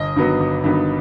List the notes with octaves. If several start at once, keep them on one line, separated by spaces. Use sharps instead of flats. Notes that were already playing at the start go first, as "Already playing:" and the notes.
Already playing: G1 D#5
G2 D#3 F#3 B3
G1
G2 D#3 F#3 B3